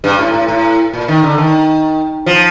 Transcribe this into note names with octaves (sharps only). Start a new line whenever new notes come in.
G2
A2
A2
A2
A#2
D#3
D3
D#3
F3